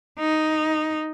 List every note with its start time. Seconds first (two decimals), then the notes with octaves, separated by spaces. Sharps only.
0.19 D#4